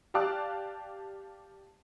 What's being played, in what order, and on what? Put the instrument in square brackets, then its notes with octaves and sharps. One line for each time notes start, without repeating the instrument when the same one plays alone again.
[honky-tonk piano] G4 D5 F5 A5 D6 F#6